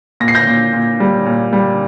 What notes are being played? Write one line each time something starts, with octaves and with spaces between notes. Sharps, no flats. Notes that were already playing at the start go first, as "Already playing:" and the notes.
A#2 A#6
C7
G6 A#6
A#2
A#2
G3
A#2
G3